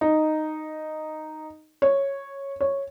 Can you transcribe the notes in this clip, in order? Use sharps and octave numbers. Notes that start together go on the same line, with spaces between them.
D#4
C#5
C#5